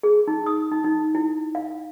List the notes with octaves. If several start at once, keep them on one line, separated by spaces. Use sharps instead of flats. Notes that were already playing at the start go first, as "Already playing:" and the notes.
G#4
D#4
D#6
D#4
D#4
E4
F5